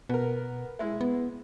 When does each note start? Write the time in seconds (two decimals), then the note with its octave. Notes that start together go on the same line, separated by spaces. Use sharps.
0.09 B2 B3 A#4
0.79 G#3 E4
1.01 B3